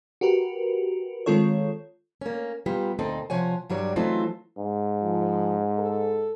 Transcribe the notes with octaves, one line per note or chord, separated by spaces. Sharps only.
F#4 G4 A#4 B4
D#3 G#3 C4 F4 A4 C#5
A#3 C#4
A#2 G3 B3 F4 G4
D2 A#2 C4 D#4 A4 D#5
C3 F3 C#5 F#5 G#5
G2 F#3 G3 C#5 D5
E3 F#3 A3 C4 D#4 F4
G#2
F3
A4